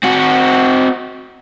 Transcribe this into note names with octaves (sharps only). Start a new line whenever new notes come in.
C4 F#4